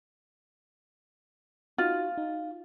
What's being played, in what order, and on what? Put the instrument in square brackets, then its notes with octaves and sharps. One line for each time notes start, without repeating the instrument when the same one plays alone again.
[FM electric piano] D#4 F#4 [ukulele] F4
[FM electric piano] D#4